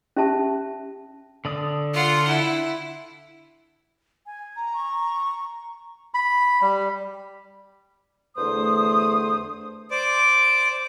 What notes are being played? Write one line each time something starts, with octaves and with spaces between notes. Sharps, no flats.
C#4 G4 E5 A5
D3 D5 D#6
F4 F#5
E4
G#5
A#5
C#6
B5
G3
E2 D3 A3 C5 D#6
C5 D5 D6